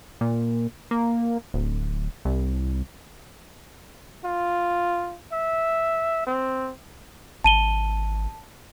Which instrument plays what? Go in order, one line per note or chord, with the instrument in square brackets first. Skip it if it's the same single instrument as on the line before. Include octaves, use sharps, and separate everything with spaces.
[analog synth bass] A#2
A#3
D1
C2
[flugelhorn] F4
E5
C4
[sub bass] G#1 [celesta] A5 D#7 G7